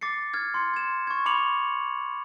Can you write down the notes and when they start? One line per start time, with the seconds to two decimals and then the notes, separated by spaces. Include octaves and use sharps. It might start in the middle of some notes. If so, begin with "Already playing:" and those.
0.01 D6 A6 C7 C#7
0.34 F6 G#6
0.54 C6 C#7
0.74 G#6 E7
1.07 C#6 G#6
1.26 B5 C#6 D6 C#7 F7 F#7